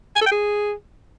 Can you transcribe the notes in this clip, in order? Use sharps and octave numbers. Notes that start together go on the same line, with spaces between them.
G#5
A4
G5
G#4